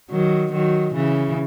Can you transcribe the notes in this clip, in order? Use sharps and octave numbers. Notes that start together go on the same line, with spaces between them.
D#3 F#3
D#3 F#3
C#3 E3